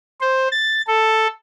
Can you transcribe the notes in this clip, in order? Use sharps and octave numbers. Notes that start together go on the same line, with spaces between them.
C5
A6
A4